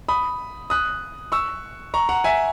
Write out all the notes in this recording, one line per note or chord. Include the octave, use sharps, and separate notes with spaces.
B5 D#6
D#6 F#6
C#6 E6
A#5 C#6
F#5 A#5
E5 G#5